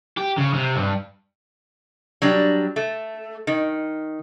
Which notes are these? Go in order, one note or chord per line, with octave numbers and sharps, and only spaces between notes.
G4
C#3
C3
G2
F#3 G3 D4
A3
D#3